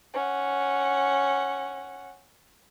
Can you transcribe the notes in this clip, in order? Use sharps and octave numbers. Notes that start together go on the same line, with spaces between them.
C#4 F#5